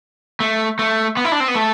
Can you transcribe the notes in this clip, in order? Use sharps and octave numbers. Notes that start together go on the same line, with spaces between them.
A3
A3
B3
E4
D4
C4
B3
A3